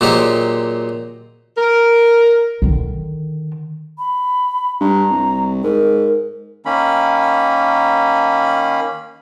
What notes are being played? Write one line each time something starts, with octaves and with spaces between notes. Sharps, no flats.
A#2 F#3 G#3 G4 C5
A#4
D3 D#3
B5
G2 A#5
C2
G#2 A#4
D#3 A#3 C#4 B5